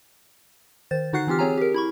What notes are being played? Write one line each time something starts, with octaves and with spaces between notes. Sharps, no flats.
D#3 C5 A6
D3 D#4 F#4 F#5 F#6 C7
E3 C4 F4 G4 F6
C4 G#4 C#5 G#5 A#5
G4 A#4
E4 B5 C#6